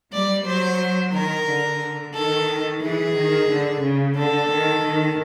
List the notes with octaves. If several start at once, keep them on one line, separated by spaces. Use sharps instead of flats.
G3 D5
F#3 C5
D#3 A#4
D3
D#3 A4
E3 G#4
D#3
D3
C#3
D3 A4
D#3
D#3